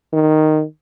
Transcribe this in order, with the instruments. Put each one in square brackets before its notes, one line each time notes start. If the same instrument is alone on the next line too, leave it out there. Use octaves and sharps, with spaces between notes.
[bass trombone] D#3